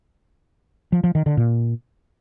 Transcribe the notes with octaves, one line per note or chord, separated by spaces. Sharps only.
F3
F3
D#3
D3
A#2